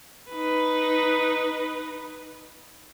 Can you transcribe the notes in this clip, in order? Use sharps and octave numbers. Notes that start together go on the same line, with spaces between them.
D#4 B4